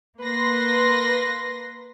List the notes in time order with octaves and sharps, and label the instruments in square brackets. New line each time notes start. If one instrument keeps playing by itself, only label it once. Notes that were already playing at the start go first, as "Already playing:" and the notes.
[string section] A#3 B4 C6 A#6